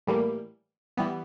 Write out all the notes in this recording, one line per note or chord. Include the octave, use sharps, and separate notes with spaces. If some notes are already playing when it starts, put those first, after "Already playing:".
A2 E3 G3 A#3
E3 G3 B3